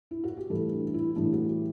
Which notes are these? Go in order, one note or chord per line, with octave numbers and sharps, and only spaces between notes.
E4
F#4
G4
A2 E3 G3 A4
D4
D4
E4
A2 E3 G3 D4
F#4
G4